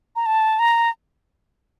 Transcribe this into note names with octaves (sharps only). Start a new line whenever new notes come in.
A#5
A5
A#5